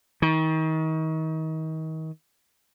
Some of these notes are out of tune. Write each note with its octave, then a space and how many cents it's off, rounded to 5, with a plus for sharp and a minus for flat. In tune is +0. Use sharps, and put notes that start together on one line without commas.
D#3 +35